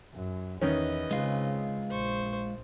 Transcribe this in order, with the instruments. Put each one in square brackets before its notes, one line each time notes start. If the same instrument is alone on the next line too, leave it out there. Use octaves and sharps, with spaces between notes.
[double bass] F#2
[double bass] E2 [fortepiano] D#3 C#4 [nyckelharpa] B4 D#5
[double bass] C#3 C4 [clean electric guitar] G#3 F4
[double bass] A#1 [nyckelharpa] C5 C#6